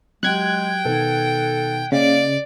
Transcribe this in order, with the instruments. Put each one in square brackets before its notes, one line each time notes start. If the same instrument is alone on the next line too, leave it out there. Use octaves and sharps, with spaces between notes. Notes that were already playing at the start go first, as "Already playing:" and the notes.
[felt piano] F#3 G4 [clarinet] G#3 [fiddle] G5 [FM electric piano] F#6 G#6
[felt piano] B2 D#3 [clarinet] A4
[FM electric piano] C#3 [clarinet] A#3 [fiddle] D5 [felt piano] D#5